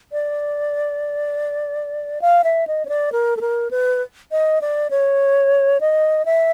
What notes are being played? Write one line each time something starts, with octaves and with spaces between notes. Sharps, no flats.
D5
F5
E5
D#5
C#5
D5
A#4
A4
A#4
B4
D#5
D5
C#5
D#5
E5